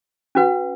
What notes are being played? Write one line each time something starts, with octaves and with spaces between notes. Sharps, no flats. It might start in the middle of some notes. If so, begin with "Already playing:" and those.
C#4 F#4 B4 F#5